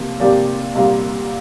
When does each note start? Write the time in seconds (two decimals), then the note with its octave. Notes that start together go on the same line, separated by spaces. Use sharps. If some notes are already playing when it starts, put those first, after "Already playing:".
Already playing: C3 F3 A#3
0.20 C3 F3 A#3 G4 D5
0.75 C2 A#2 G3 A#3 F4